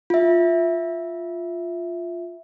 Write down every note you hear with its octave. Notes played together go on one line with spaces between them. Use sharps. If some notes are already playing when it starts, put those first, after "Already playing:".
F4 E5